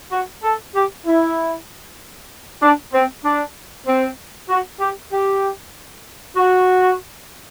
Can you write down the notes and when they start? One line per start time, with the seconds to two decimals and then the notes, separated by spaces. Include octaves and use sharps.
0.11 F#4
0.43 A4
0.74 G4
1.06 E4
2.61 D4
2.93 C4
3.24 D4
3.86 C4
4.49 F#4
4.80 G4
5.12 G4
6.37 F#4